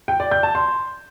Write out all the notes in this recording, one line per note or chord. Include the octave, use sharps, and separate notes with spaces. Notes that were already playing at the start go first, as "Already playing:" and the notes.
G5
D5
G6
A5
C6